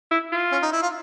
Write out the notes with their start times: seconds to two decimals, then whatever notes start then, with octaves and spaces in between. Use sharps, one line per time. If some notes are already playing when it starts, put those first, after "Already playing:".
0.11 E4
0.32 F4
0.52 C#4
0.62 D#4
0.73 E4
0.83 F4